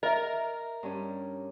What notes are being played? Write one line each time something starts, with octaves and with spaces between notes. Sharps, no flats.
A#4 D#5 E5
G2 C#4